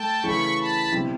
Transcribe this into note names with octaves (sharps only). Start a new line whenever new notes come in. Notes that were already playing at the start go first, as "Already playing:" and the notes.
Already playing: A3 G5 A5
C#3 E3 A3 B5 C#6
A5 B5
B2 G3 C4 E4